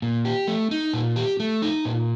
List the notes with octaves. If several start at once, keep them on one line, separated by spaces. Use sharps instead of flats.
A#2
G4
A3
D#4
A#2
G4
A3
D#4
A#2